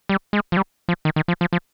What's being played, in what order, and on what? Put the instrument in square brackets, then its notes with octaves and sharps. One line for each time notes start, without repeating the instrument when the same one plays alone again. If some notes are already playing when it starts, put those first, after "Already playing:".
[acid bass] G3
G#3
F3
G3
F3
D#3
D#3
F3
F3
F3